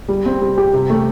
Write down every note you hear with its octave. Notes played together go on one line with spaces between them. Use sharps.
G3
C4
G3
G4
C3
A3